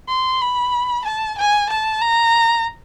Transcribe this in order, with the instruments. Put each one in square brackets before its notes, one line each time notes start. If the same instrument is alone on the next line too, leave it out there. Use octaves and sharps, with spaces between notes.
[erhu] C6
B5
A5
G#5
A5
A#5